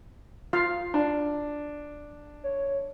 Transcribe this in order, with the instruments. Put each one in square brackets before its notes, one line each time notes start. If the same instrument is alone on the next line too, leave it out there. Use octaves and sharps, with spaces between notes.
[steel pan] F4 F5
[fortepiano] D4
[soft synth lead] C#5